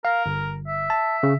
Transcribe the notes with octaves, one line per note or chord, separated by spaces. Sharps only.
A#4 F5
G1
E5
A5
C#3